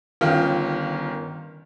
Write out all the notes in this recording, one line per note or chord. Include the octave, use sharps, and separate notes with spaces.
G1 D#3 C#4 F4 G5